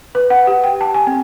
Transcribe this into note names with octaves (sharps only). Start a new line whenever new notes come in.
B4
F#5
G4
G5
A5
G#5
C4